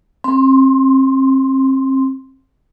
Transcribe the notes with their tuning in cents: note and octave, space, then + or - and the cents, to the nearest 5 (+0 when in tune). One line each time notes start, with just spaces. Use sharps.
C4 +35 C6 +0